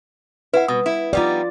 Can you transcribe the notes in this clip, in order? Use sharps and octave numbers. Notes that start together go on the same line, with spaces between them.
E4 B4 F#5
B2 D#6
E4
G3 B3 D#4 F4 D5